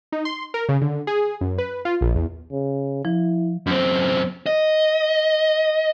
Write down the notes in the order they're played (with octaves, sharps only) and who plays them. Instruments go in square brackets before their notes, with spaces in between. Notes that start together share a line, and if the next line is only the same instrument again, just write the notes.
[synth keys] D#4
C6
A#4
C#3
D3
G#4
F#2
B4
F4
A#1
E2
[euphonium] C#3
[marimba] F3 [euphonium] E4
[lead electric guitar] F#2 C4
D#5